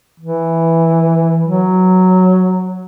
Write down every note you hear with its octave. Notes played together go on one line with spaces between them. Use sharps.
E3
F#3